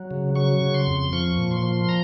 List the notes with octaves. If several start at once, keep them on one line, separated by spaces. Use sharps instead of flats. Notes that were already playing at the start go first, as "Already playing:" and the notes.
Already playing: F#3
C#3
F#3 C#6
C#3
C6
F2
F3 C#6
A#2
C6
F3
A#5